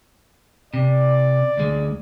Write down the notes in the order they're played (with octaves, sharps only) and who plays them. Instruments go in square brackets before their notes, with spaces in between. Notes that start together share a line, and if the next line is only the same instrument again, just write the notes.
[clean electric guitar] C3 [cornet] D5
[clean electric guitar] D2 G#3